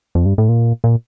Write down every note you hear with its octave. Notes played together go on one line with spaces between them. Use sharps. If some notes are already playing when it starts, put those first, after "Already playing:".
F2
G2
A2
A#2
A#2